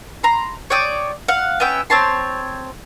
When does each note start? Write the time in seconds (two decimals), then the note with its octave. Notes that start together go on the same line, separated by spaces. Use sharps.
0.23 A#5 C6
0.70 C#5 D5 G5 D#6
1.28 F5 F#5
1.60 B3 C#4 E5 G5
1.90 C4 C#5 A5 C6